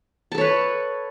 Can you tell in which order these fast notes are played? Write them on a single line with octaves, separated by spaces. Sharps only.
A5 A4 C#5 B4